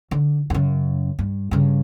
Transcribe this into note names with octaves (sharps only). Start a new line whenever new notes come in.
D3
F#2 C#3
G2
G2 C#3